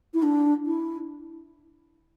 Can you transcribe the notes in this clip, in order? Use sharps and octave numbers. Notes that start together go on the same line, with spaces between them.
E4
D4
E4